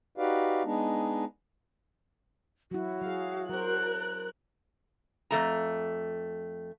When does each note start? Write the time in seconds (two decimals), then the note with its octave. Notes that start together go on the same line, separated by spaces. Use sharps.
0.18 D#4 F#4 G4 B4 D5 F5
0.65 G#3 B3 D4 D#4
2.71 F#3 E4 F#4
3.02 F#3 G#4 F5
3.49 F#3 A#4 C5 F#6
5.31 F2 A3 A#5